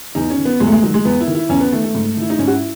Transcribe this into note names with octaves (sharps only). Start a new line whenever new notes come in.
E2 D#4
C#4
D#3
B3
E2 G#3
A3
G#3
D#3 F#3
G#3
E2 B3
E4
D#3
E4
E2 C#4
B3
D#3 A3
A3
G#2
D#3 E4
D#4
G#2 C#4
F#4
E4